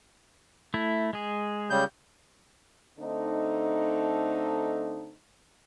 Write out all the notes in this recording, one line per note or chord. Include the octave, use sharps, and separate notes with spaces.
A3 E4
G#3 G#4
C#3 G3 G6
D3 A3 C4 D#4